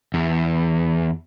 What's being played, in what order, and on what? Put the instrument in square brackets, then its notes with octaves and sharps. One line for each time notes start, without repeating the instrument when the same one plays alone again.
[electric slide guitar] E2